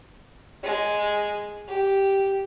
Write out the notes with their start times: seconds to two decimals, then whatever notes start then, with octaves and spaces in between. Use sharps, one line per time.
0.63 G#3
1.68 G4